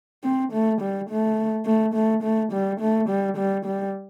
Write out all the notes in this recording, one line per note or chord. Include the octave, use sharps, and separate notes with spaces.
C4
A3
G3
A3
A3
A3
A3
G3
A3
G3
G3
G3